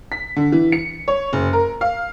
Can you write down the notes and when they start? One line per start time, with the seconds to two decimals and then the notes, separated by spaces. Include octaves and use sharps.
0.12 B6
0.36 D3
0.52 E3
0.72 C#7
1.08 C#5
1.33 F#1
1.53 A#4
1.81 F5